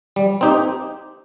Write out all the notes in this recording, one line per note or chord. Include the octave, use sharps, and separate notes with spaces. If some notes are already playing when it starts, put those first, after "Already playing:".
G3
C4 D#4 G4